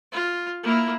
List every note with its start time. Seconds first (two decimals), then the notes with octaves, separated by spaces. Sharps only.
0.12 F4
0.63 A#3 E4